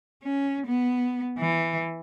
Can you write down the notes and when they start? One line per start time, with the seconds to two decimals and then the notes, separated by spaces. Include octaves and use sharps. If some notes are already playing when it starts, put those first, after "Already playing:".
0.23 C#4
0.66 B3
1.39 E3